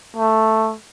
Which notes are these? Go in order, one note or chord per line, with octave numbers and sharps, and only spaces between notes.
A3